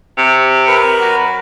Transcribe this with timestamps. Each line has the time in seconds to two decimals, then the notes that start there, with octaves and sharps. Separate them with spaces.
0.17 C3
0.67 A#4 B4
1.01 F#3